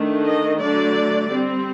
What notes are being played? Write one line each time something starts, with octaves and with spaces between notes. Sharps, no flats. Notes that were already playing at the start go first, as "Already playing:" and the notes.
Already playing: D#3 A3 D4
D#5
D3 F#3 A3 D5
G3 C4